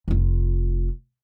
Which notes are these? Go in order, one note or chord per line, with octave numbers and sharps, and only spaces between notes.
F1 F4